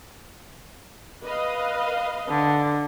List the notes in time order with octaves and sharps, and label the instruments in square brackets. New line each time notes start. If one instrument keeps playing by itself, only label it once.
[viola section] B4 D#5 F5
[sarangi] D3